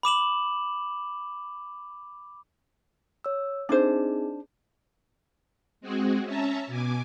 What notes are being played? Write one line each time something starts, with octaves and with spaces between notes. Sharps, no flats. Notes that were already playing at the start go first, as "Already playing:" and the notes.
B5 D6 E7 F#7
C#5 E6
C4 D4 D#4 G#4 C5
G#3 C4 F#4 G#4
C#4 E5 A5 A#5
B2 G#5 D6